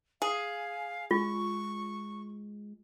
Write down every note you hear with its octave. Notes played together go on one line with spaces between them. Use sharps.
G#4 F5
G#3 F4 C#6